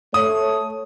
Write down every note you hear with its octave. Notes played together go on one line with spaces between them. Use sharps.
A3 C#5 D#6